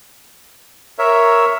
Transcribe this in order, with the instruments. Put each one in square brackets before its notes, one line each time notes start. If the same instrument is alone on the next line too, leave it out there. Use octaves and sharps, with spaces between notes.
[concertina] A#4 C#5 E5